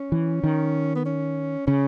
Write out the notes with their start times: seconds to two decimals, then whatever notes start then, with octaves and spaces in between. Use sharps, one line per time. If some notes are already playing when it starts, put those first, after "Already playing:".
Already playing: C#4
0.12 E3
0.43 D#3
0.95 B3
1.06 C#4
1.67 C#3 C#4